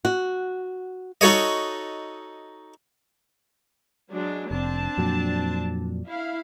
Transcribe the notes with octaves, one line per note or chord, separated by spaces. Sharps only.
F#4
D#4 F#4 A4 C#5 D#5
F#3 G#3 D4
F1 C4 D4 A5
F2 A#2 F#3
E4 F5